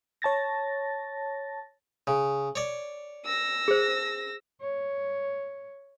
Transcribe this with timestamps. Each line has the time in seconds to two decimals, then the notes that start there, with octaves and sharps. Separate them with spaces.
0.22 C#5 A5 A6 A#6
2.07 C#3
2.56 C#5 D5
3.25 E6 A#6
3.68 G#4 C5
4.61 C#5